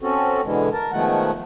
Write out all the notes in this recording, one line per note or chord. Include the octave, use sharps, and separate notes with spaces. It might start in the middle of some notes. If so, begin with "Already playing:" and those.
C4 C#4 F#4 A4
B2 D3 E3 G#3
A#4 A5
B2 D#3 F3 G#3 A3 F#5